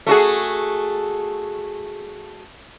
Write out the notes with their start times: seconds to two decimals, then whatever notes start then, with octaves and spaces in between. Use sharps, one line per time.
0.07 A3 F#4 G#4